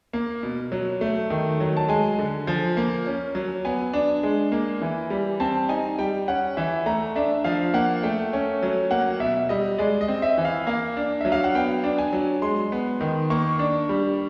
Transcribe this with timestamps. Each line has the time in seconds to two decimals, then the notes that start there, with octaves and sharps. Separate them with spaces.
0.13 A#3
0.43 B2
0.72 F#3
1.01 A3
1.30 D#3
1.60 F#3
1.77 A5
1.89 G#3 G#5
2.18 D3
2.47 F3
2.77 A#3
3.06 C#4
3.35 F#3
3.65 B3 G#5
3.93 D4
4.23 G#3
4.52 A#3
4.81 E3
5.10 G3
5.40 C4 A5
5.69 D#4 G#5
5.99 G3 G5
6.28 C#4 F#5
6.57 E3 E5
6.86 A3 A#5
7.16 D4 E5
7.44 F3 F5
7.74 A#3 F#5
8.03 A3 G5
8.33 C#4
8.62 F#3
8.91 A#3 F#5
9.20 B2 E5
9.49 G3 D#5
9.78 G#3 D5
10.01 D#5
10.08 C4
10.22 E5
10.38 E3
10.45 F5
10.67 A#3 F5
10.97 D4
11.21 F#3 E5
11.32 F5
11.44 F#5
11.55 B3 G5
11.84 D4
11.98 G#5
12.13 F#3
12.42 G#3 C6
12.72 B3
13.01 D#3
13.30 A#3 C#6
13.59 D4
13.89 G3